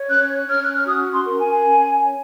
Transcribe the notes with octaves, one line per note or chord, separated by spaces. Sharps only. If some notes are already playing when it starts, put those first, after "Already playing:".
Already playing: C#5
C#4 F#6
C#4 F6
F#6
F6
F#4 D#6
C6
A#4
G#5
C#4
C#5